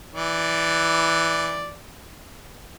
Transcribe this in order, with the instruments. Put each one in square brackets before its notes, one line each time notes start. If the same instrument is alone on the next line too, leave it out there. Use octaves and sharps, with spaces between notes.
[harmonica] E3 D5